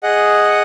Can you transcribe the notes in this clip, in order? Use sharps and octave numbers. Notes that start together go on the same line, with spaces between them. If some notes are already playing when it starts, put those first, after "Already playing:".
G#4 D#5 F#5